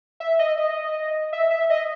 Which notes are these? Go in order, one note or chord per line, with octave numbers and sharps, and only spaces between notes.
E5
D#5
D#5
E5
E5
D#5